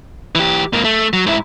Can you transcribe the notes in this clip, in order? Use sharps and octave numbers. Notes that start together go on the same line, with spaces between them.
E3 G4
G#2 A#3
A3
F#3
G#2 E4